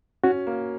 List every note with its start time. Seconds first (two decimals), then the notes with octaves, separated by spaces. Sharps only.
0.24 C#4 F#4
0.47 A#3